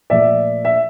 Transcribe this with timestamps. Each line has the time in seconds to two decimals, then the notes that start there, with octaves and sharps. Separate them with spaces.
0.10 A#2 F3 A3 D5 E5
0.65 E5